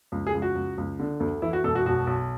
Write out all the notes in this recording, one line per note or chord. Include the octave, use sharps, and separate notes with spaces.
C#2
G#4
C#2
F#4
C#2
C#2
D3
D2
E3 E4
F#4
E1 A4
F#4
B1 F#4
B1